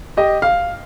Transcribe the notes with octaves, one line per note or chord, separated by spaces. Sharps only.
G4 D#5
F5